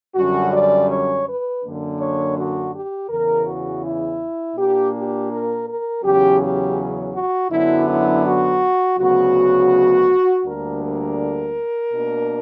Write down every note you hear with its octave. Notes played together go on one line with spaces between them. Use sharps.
F#2 D3 G3 C#4 F#4
D5
C#5
B4
F#2 D3 A#3 D4
C#5
F#4
G4
E2 C#3 E3 A#4
F#4
E4
A#2 A#3 D4 G4
G4
A#4
A#4
E2 C#3 F#3 C#4 G4
G4
F#4
F#2 D3 F#3 B3 D4 E4
E4
F#4
D2 C#3 F#3 B3 F#4
D2 D3 G3 A#3 D4 A#4
A#4
B2 A#3 D4